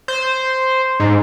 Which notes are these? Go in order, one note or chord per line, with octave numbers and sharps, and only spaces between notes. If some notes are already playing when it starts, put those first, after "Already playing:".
C5
G#2